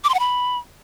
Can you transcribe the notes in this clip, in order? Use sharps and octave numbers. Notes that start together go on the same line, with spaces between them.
D6
C6
F#5
B5